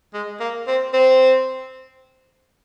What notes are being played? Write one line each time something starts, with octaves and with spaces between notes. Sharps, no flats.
G#3
A#3
C4
C4